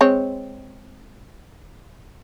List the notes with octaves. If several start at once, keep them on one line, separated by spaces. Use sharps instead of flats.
G#3 C4 C#5